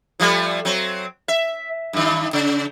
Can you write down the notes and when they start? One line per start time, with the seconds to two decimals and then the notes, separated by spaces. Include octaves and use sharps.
0.20 F3 G3 A3
0.65 F#3 C4
1.28 E5
1.93 G2 D#3
2.33 C#3